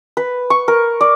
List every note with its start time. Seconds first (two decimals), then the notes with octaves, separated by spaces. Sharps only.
0.17 B4
0.50 C#6
0.68 A#4
1.01 D5